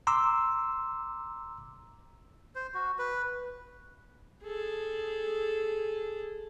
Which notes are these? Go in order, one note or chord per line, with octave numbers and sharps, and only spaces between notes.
A#5 C6 D6 E6
C5
F#4
B4
G#4 A4